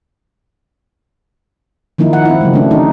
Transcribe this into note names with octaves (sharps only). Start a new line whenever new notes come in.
D#3 F3 A#3 D#4 E4
F#5
C4 E4
C#3 F#3 G#3
A3 D4
E3 D#4